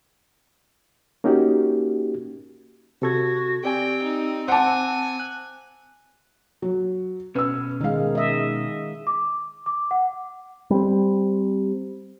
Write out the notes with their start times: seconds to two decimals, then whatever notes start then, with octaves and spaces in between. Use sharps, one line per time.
1.24 A#3 C#4 D#4 F#4 G4
3.02 C3 F#4 A4 G#6
3.64 C4 G4 D5 G5 G#5
4.02 D#4
4.48 C5 F#5 G#5 A5 D6
5.20 F#6
6.62 F#3
7.35 B2 C#4 B4 E6
7.81 D#3 G#3 D#4 F5
8.15 D#5 E5
9.07 D6
9.66 D6
9.91 F#5
10.70 G3 C4